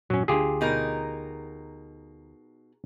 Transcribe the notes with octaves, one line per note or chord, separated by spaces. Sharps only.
G#1 F2 A#2 F#3 C#4
D2 D4 F4 G4 G#4
B2 D#4 A#4